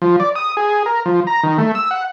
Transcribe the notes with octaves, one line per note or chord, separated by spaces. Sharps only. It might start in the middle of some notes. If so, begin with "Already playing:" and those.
F3
D5
D#6
G#4
A#4
F3
A#5
D#3
A3
E6
F#5